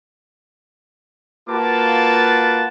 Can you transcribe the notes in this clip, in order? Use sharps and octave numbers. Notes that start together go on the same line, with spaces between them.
A#3 F4 F#4 B4 A5 D6